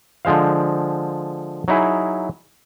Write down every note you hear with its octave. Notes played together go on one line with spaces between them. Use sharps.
D3 F3 G#3 C5 F5
F#3 D#4 E4 G#4